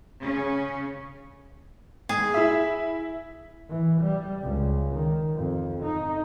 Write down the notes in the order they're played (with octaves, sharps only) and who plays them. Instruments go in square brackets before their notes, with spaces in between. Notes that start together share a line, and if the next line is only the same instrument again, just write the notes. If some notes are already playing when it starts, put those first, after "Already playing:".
[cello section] C#3 C#4
[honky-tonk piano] G#2 [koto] G#4
[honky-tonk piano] E4 E5
[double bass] E3
G3
C#2
D#3
F2
D#4